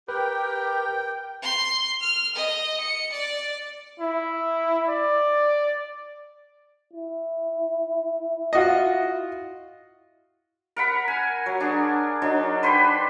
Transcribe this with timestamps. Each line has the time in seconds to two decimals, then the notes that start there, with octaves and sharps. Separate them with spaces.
0.08 G4 A#4 B4 G5
1.42 C6
2.00 F6
2.35 D#5
2.80 C#7
3.13 D5
3.99 E4
4.88 D5
6.93 E4
8.53 F4 F#4 D#5
10.76 A#4 F#5 B5
11.08 G#5
11.46 F#3
11.60 D4 G#4
12.22 F#3 D4 D#4
12.63 B4 C5 G5 B5